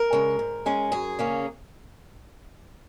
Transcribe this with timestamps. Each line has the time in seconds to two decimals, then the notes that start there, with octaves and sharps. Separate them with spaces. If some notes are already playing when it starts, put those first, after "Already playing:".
Already playing: A#4
0.13 C#3 G#3
0.39 G#2
0.66 G#3 C#4
0.92 F#2 G#4
1.19 C#3 A#3 C#4